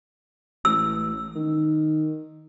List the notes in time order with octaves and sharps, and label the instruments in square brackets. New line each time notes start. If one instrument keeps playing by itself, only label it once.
[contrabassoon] A1 [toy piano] E6
[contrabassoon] D#3